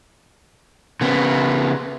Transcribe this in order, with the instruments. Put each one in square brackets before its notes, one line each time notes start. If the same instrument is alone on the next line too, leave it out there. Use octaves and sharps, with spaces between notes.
[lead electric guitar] C#3 B3